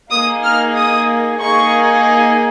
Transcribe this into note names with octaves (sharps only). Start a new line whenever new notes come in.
A#3 D#4 G#4 D#6
F6
D#6
A#3 D#4 G#4 C#6